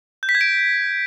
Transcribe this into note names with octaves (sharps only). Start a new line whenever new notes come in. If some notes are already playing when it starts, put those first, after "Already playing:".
G6
B6
G#6
D7